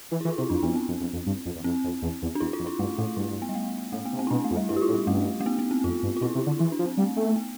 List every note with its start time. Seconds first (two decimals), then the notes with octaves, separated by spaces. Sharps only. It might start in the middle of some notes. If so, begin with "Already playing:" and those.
0.11 E3
0.21 E4
0.25 E3 F4
0.38 C3 E4
0.50 F2 D4
0.62 E2 B3
0.69 F2
0.75 C4
0.88 F2
1.00 F2
1.13 F2
1.26 G2
1.45 F2
1.56 E2
1.64 F2 C4
1.84 F2
2.02 E2
2.22 E2
2.35 D4
2.40 E2 E4
2.53 F4
2.60 F2
2.67 E4
2.79 G2 A3
2.98 A2 A3
3.16 G2 E4
3.42 B3
3.49 G3
3.55 A3
3.92 A2 A3
4.05 B3
4.13 C3
4.19 C4
4.27 E4
4.31 B2 D4
4.44 A3
4.50 F2
4.56 G3
4.69 G2 E4
4.76 G4
4.82 F4
4.88 A2
4.94 G3
5.07 G2 A3
5.40 A3
5.46 B3
5.59 B3
5.71 C4
5.84 F2 F4
6.03 G2
6.16 F4
6.21 B2 E4
6.35 C3
6.46 D3
6.59 E3 E4
6.72 D4
6.79 F3
6.86 C4
6.97 G3 A3
7.16 A3 B3
7.36 B3